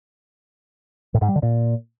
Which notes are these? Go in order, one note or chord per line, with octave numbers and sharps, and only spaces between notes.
A2
G#2
G3
D3
A#2